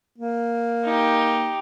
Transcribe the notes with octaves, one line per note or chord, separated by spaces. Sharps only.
A#3
D#4 G4